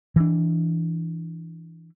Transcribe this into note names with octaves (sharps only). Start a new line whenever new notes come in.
E3 D4